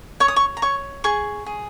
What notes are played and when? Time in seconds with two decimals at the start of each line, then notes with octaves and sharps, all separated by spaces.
0.20 C#5 C#6
0.28 D#6
0.36 C#6
0.57 A#5
0.62 C#5 C#6
1.04 G#4 C#6
1.46 G#4